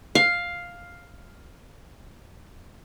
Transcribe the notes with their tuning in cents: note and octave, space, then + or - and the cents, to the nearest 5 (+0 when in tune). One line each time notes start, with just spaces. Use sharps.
F5 +5